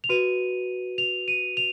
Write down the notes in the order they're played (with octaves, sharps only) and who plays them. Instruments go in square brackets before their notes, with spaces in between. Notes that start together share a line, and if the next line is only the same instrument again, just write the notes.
[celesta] F7
F#4 B4 D#7
F7
D#7
F7